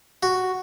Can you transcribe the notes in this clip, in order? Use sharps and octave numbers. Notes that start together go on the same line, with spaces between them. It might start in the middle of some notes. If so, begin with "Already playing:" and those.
F#4